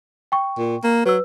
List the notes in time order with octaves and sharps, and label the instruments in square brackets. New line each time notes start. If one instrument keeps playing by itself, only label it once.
[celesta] G5 C#6
[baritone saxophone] A#2
A#3
[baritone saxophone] F#3 [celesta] B4 E6